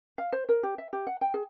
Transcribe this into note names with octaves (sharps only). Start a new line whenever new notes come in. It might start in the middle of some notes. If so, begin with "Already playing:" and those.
F5
C5
A#4
G4
E5
G4
F#5
G5
G#4